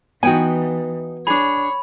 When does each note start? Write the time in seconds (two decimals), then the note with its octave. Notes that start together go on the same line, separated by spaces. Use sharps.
0.23 E3 B3 D#4 F#4 G5 G#5
1.27 D4 G#4 C#5 B5